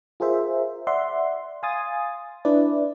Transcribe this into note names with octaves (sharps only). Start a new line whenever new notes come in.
F4 G#4 A#4 C5 E5
D5 E5 F#5 C6
F5 G#5 C6 D#6 A6
D4 E4 B4 D5